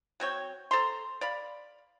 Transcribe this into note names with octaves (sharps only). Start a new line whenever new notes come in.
F#3 C4 C#5 G5
A4 C5 A#5 C6
D5 F5 B5